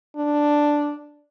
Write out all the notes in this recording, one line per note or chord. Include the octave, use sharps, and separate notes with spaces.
D4